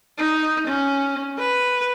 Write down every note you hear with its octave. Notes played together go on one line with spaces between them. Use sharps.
D#4
C#4
B4